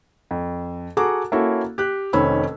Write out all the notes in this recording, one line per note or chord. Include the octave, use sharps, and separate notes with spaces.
F2
F#4 G#4 A4 F#5 A#5 D6
A#3 C#4 E4 F#4 A4
G4 F#6
F1 D#3 C#4 C5 B5 E6